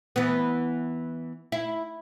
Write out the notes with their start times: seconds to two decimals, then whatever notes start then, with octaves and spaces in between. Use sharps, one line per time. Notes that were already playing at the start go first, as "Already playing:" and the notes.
0.16 E3 B3
1.52 E4